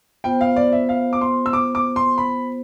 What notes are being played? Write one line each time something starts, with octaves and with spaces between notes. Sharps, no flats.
B3 F4 C5 G5
F5
D5
E5
F5
D6
C6
E6
D6
D6
C6
B5